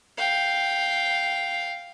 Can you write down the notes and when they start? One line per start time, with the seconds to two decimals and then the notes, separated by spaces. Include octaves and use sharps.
0.18 F5 G5